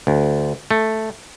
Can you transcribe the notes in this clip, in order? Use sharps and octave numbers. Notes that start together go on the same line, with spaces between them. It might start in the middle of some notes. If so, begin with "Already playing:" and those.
D2
A3